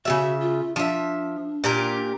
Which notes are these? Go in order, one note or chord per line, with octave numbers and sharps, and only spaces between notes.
C#3 G3 F#4 E5
F4
F3 D4 E5
A#2 G4 A#4